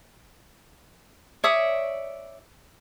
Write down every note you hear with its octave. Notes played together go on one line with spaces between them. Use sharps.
C#5 D5 E5 D#6